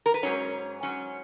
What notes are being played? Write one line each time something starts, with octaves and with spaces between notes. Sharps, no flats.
A#4
B4
G#2 F#3 C#4 C#5
G#2 F#3 C#4